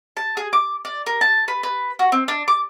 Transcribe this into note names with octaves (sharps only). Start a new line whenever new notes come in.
A5
G#4
D6
D5
A#4
A5
B4
B4
F#4
C4
D4
D6